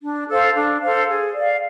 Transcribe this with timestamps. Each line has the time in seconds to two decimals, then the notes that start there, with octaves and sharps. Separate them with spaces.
0.03 D4
0.30 A4 C5 F5
0.55 D4
0.81 A4 C5 F5
1.09 G#4
1.34 D5 F5